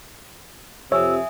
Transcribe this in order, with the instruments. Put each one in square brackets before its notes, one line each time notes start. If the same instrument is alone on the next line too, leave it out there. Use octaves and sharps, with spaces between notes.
[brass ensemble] F2 C3 [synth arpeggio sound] C#5 [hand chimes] E5 G#5 D#6 [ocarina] E6